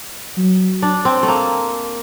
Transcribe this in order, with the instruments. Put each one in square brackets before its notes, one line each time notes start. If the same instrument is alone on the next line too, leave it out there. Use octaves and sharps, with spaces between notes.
[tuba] F#3
[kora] D4
C4
A3
A#3